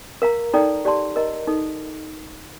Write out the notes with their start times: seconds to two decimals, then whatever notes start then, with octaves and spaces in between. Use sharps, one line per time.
0.22 A#4 F5 A#5
0.54 D#4 A4 D5 G5 A#5
0.85 G4 D5 A5 C6
1.16 A#4 D#5 A#5
1.47 D#4 A4